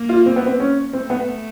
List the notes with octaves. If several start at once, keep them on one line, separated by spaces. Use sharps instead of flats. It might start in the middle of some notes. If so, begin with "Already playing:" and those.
Already playing: A#3
F4
C4
B3
C4
C#4
A3 C4
B3